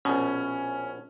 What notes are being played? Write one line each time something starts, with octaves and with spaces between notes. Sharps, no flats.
A#1 B2 C#4